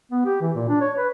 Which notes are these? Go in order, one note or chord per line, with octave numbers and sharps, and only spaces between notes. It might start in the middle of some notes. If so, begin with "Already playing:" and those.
B3
G4
E3
A#2
D4
C#5
B4